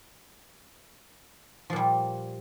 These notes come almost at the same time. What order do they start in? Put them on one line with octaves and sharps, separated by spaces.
F3 A#2 G3